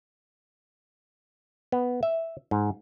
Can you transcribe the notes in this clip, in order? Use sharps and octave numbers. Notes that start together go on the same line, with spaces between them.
B3
E5
G#2